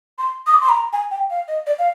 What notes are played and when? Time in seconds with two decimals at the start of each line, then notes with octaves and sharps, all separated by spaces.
0.18 C6
0.47 D#6
0.54 D6
0.61 C6
0.69 A#5
0.93 G#5
1.11 G5
1.30 F5
1.48 D#5
1.66 D5
1.78 F5